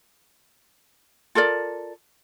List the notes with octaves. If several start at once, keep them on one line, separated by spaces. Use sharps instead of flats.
F4 A4 A#4 D5